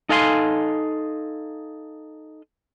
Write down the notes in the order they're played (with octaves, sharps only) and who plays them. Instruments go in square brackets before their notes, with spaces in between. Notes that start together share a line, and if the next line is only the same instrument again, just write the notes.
[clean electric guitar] D#4 A4 F5 G#5 A#5 C6